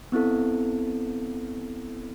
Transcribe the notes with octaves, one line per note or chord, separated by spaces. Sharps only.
B3 C4 E4 A4